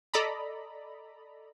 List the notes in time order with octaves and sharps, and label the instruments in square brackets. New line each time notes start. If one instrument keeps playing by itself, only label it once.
[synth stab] A4 D5 D#5 A#5 B5